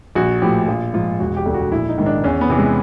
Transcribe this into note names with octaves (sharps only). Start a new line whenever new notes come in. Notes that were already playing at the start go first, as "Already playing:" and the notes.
A#1 F#4
A2 F3 G4
A#1 F4
G#2 F3 F4
E1 F#4
G4
D2 D3
F#4
A#1 E4
D#4
G#2 D#3
D4
E2 C#4
B3
C3 E3
G#3